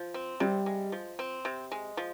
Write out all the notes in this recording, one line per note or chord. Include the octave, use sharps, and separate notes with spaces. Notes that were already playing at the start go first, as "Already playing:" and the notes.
Already playing: F3
C4
C3 G3
G#3
F3
C4
C3
G#3
F3